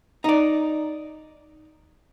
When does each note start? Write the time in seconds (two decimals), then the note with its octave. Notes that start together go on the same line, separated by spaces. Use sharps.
0.24 D#4 D5